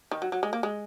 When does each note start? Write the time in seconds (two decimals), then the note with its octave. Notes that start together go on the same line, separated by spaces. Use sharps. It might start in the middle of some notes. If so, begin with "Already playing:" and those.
0.11 D#3
0.22 F#3
0.32 F#3
0.43 G#3
0.53 A#3
0.63 G#3